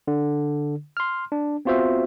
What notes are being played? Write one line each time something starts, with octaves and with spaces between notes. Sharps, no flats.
D3
C6 F6
D4
B3 C4 F4 F#4 C5 E5